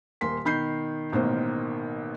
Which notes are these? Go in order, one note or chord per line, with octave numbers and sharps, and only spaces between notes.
D#1 A#3 C6 B6
B2 D#3 B5 G6 C7
A1 B2 D#3 A#3 C5